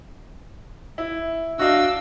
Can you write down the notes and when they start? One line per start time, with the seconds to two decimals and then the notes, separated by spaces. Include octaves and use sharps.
0.98 E4
1.59 D4 F#4 D#5 F5 E6